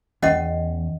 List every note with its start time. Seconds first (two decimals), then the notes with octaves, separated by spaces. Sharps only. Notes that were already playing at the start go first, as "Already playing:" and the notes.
0.22 E2 C#4 D#5 F#5